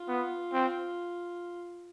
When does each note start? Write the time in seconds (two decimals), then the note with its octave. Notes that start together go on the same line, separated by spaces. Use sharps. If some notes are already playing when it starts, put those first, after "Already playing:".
Already playing: F4
0.08 B3
0.53 C4